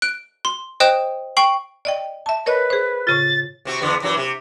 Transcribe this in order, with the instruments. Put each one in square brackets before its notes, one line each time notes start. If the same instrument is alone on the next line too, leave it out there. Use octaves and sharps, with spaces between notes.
[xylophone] F#6 D7
C6
C5 D#5 G5 D#6 F#6 E7
G5 C#6 C7 F#7
[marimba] D5 D#5 G5
E5 A5
[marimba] A#4 C#5 D#5 [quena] B4
[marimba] G#4 C5
[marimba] A2 C#3 F4 [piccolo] A6
[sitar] C3 C4 F#4
E2 D3 B3
F#2 E3 F#3
C3